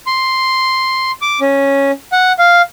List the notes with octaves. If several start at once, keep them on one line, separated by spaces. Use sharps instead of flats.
C6
D6
C#4
F#5
F5